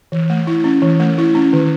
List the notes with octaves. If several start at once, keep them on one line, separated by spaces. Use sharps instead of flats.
E3
A3
E4
C#4
E3
A3
E4
C#4
D#3